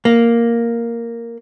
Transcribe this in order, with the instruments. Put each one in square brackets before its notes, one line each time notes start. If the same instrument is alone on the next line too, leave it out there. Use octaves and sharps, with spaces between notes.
[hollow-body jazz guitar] A#3